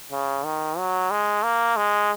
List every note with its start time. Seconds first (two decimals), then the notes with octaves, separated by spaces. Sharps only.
0.12 C#3
0.45 D#3
0.78 F#3
1.11 G#3
1.43 A#3
1.77 G#3